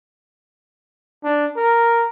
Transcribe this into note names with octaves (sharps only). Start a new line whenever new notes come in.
D4
A#4